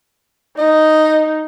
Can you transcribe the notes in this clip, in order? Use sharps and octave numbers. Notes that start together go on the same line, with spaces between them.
D#4 D#5